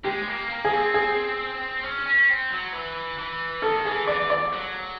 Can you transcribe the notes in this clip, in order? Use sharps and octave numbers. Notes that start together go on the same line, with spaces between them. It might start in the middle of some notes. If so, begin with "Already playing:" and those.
G#3 G4
A#3
A#3
G#4
C4
G#4
C#4
C#4
C4
F#3
E3
E3
D#3 A4
E3 G#4
E3 D5
D5
F#3